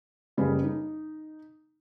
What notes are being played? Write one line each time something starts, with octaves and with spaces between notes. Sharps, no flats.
F#1 C#3 G3 G#4 B4
D#4